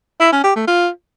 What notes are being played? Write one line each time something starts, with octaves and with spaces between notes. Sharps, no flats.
E4
C#4
G4
A3
F4